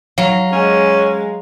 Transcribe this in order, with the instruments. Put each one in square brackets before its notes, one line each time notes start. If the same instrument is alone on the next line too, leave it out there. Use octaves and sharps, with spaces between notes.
[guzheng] F#3 [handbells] F5 A#5
[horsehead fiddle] G#3 [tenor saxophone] C#4